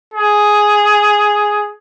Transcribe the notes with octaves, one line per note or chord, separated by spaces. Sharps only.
G#4